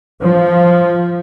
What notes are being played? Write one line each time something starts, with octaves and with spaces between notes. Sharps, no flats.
F3